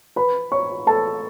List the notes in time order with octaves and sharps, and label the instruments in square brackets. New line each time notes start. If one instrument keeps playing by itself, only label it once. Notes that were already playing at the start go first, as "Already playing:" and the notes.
[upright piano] B4 B5
C#5 C#6
A4 A5